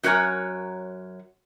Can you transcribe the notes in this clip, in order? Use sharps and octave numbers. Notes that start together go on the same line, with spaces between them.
F#2 F#4 A#4 C#5 G#5 A#5